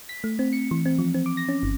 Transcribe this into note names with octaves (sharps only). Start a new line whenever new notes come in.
B6
A3
C4
C#7
E3
C4
F3
C4
D6
A#6
C#4
G1